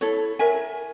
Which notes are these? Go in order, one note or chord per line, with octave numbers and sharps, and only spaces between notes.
E4 A4 C#5
A#4 C#5 E5 G#5